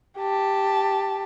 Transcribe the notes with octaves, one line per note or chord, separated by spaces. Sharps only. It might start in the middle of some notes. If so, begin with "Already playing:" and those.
G4 A5